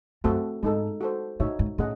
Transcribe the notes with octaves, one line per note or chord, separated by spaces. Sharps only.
F#2 A3 C4 F#4 A4
G#2 G#3 D#4 A4
F#4 A4 C5
A2 D#4 F#4 C#5 E5
G#2
A2 A3 C#4 G#4 D#5 F#5